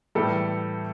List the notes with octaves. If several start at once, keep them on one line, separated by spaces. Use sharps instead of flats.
A2 E3 G3 A4